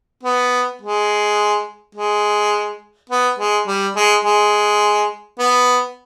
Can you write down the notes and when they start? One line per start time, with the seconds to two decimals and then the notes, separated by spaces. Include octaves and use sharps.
0.24 B3
0.82 G#3
1.95 G#3
3.10 B3
3.39 G#3
3.67 G3
3.96 G#3
4.25 G#3
5.39 B3